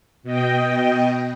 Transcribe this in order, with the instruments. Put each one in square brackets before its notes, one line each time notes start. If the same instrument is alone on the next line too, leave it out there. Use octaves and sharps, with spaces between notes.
[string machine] B2 D#5 G5